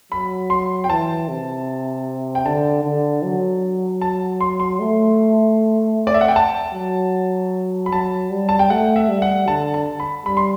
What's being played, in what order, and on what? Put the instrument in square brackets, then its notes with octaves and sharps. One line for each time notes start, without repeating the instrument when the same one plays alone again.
[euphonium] F#3 [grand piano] B5
[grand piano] C6
G5
[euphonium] E3 [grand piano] A5
[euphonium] C3
[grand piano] G5
[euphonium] D3 [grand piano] A5
[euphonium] D3
F#3
[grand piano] A5
C6
C6
[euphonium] A3
[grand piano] D5
E5
F#5
G5
A5
[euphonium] F#3
[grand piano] B5
[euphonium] F#3 [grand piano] A5
[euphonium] G3
[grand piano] A5
G5
[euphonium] A3 [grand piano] F#5
[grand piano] E5
[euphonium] G3
[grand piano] F#5
[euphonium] D3 [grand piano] A5
[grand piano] A5
B5
[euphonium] G3 [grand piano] B5
[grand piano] C6